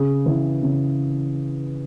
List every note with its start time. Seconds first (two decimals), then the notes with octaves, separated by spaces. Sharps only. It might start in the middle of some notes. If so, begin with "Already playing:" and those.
Already playing: C#3 G#4
0.26 E3
0.63 C#3